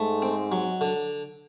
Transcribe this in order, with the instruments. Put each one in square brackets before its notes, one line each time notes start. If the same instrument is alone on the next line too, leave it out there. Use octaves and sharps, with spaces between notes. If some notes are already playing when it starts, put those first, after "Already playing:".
Already playing: [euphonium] G#2 [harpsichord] A3
[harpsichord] C4
F#3
D3